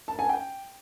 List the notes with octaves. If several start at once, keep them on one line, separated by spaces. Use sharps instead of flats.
A5
G#5
G5